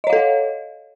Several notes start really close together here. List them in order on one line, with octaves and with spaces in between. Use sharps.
D#5 C#5 F5 A4